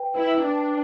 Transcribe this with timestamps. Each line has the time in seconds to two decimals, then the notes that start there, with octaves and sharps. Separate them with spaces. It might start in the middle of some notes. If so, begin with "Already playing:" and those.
Already playing: B4 G5
0.15 E4 B4
0.43 D4 D6